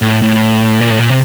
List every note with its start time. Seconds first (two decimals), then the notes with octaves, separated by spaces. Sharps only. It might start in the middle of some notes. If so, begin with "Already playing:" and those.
0.02 A2
0.22 A2
0.80 A#2
0.91 A2
0.99 A#2
1.10 C3